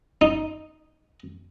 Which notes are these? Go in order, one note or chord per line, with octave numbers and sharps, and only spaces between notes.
D#4